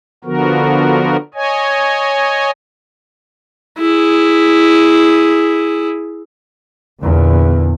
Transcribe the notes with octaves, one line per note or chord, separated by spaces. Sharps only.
D3 F3 B3 F#4 A#4
C#5 D#5 G#5
E4 G#4
E2 A#2 D3